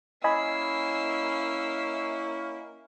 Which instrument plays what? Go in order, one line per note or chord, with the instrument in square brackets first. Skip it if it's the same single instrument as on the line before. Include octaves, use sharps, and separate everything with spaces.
[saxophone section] A#3 C#4 E4 [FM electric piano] D#5 G#5 B5 [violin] E6 C7